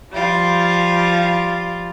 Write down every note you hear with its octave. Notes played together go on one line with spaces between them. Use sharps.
F3 G3 F4